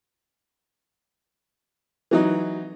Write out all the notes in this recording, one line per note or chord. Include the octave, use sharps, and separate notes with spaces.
E3 F#3 D#4